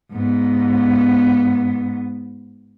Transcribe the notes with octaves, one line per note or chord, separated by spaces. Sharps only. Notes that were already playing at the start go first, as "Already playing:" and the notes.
G#2 B3